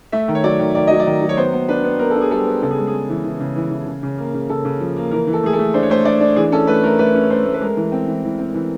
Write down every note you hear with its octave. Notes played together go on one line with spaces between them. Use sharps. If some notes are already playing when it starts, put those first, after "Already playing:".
A3 E5
D#3
C#5
F#3 D5
D#3
D#3 D5
F#3 D#5
D5
D#3
F#3
C#5
B3 C5
B3
D4 B4
B3
B3 A#4
D4 A4
G#4
G3 A4
B3
C#3 A4
G#4
G#3
G#4
G#3
E3
E3
C#3
E3
E3
C#3
C#3
A#3
C#3
C#3 A4
C#3
F3
A#3
E3 A#4
E3
A4
A3 G#4
A4
A3
D4 C5
C#5
A3 C5
D4 D5
D4
E3 G#4
C#4 A4
A3 B4
A3 A#4
A3 B4
C#4
A3 C5
A3
B4
G#3 A#4
E3
C4
E3
E3
C4
E3